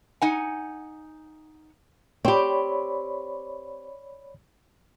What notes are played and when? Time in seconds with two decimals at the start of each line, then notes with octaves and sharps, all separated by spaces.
0.22 D#4 F#5 G#5
2.25 C4 G4 C#5 D5 B5